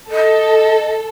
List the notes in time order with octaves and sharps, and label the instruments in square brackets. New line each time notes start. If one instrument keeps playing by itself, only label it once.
[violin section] A4 [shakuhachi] D#5